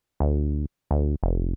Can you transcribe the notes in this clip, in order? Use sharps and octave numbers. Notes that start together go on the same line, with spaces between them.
D2
D2
F1